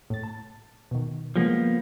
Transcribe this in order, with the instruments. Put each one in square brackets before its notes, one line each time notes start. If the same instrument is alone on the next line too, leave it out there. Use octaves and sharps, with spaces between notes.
[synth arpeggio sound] A2 A6
A5
B2 D#3
[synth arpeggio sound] C#3 G3 G#3 [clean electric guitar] F3 A#3 B3